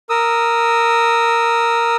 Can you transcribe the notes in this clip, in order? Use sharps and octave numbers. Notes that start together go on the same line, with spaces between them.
A#4 D#6 E6